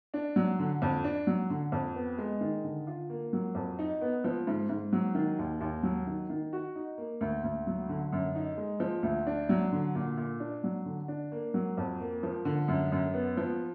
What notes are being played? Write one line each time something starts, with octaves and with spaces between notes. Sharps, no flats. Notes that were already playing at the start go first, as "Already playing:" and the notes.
D4
F#3
D3
F2
D4
F#3
D3
F2
B3
G#3
D#3
D3
F4
A#3
F#3
F2
D#4
B3
F3
G#2
G#2
F#3
D#3
D#2
D#2
F#3
D#3
D#3
F#4
D#4
A#3
D2
D2
F#3
D3
F#2
D#4
G#3
F3
D2
D4
F#3
D3
A#2
A#2
D4
F#3
D3
D4
A#3
F#3
F2
A#3
F3
D3
F#2
F#2
B3
F3